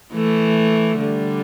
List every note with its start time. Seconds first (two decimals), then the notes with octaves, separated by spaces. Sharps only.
0.14 E3 A3
0.99 D3 G3